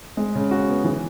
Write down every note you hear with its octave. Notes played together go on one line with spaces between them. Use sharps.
G#3
C#3
F#4
B3
E3